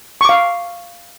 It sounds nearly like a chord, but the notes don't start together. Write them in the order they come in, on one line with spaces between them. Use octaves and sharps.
C#6 D6 F5